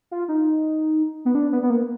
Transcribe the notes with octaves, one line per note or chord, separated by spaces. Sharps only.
F4
D#4
B3
D4
B3
B3
A#3